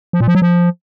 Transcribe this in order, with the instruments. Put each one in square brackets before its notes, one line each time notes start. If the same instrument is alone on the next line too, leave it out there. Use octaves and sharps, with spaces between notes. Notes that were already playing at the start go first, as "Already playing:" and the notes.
[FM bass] F3
A#2
F3
F#3
F3